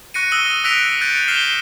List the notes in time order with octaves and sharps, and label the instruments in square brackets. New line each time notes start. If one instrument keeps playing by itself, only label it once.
[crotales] C#6 F#6 A#6 C#7 D#7
D#6 E6 A#6 D#7 G7
E6 F#6 A#6 B6 D7 F7
F#6 G6 A6 C#7 D7
F6 C7 E7 F7 G7